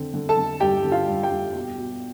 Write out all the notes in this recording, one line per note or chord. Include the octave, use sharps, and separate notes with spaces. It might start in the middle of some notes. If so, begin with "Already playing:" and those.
Already playing: D3 C4
D3
A4 A5
D3
G2 G4 G5
D3
F4 F5
G2
G4 G5
G2
B2
B2